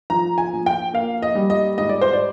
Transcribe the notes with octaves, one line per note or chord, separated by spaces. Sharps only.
F3 A#5
G#5
A#1
G5
A#3 F5
D#5
G3
D#5
G#2 D#5
D5
C5
D5